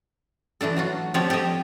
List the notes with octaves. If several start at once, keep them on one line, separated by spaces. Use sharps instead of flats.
E3 A3 D4 A4
F#3 F4 F#4
F3 C4 F4 G4 C#5 D5
G4 A4 C#5 D#5 E5